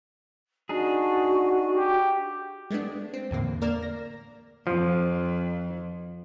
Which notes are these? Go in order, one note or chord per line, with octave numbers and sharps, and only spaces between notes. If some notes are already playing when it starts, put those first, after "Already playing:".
D4 D#4 F#4 G#4
G4
G#3 A3 B3 D4
C4
E2 A2 D3 A#3
A#3 A#4 D5 F6 E7
A#6
F2 F3